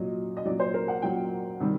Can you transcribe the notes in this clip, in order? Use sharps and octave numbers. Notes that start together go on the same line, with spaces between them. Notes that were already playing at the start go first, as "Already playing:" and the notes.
Already playing: A#2 F#3 D#5
D#5
A#2 F#3 D5
C5
A#4
F#5
A#2 F#3 G5
C3 D#3 G3